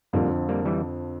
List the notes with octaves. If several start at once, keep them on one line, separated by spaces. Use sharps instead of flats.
F2 D3 F3 G3 A#3
G3 A#3
E3 G3